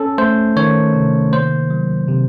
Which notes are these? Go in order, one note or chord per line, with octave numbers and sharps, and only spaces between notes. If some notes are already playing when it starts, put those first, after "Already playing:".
Already playing: C#4 A4
A3 C5
D#3 C#5
C3
A#3 C5
F#3
C3